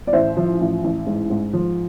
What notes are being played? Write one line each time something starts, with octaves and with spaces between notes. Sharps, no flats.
D5
A1 C5 E5
F3
A1
A1
G#2
G#2
F3